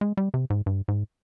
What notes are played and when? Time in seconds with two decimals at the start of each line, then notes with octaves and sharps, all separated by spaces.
0.01 G#3
0.17 G3
0.34 C3
0.50 G#2
0.66 G2
0.88 G#2